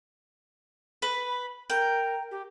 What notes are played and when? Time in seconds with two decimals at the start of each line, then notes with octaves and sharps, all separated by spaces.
1.02 B4 B5
1.70 A#4 G5
2.31 G4